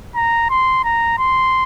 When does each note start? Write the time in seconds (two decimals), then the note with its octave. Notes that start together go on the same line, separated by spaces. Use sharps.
0.16 A#5
0.50 C6
0.84 A#5
1.18 C6